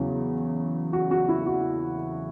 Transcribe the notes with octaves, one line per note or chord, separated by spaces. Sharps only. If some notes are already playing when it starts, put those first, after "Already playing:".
Already playing: E2 C#3 F#3
F#4
F#4
E4
F#4